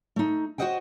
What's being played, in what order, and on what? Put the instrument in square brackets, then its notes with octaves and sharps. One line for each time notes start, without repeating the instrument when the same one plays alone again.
[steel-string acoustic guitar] A3 D#4
F#4 A4 C5 D#5 F#5 G5